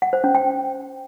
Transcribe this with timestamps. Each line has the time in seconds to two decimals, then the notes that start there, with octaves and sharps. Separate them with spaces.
0.02 F#5
0.13 C5
0.24 C#4
0.35 G5